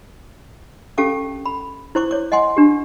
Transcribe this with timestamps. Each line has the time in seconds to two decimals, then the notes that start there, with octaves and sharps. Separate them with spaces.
0.98 C#4 G4 A4 F5 A5 D6
1.46 B5
1.95 E4 C5 C#6 D6
2.11 C#5 D6
2.32 D#5 F#5 G#5 C6 D6
2.57 D4 G4